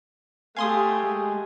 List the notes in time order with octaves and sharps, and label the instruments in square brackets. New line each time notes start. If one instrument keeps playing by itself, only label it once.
[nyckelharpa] A3 G4 [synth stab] F5 C6 D#6 [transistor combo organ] G#5
[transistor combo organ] G#3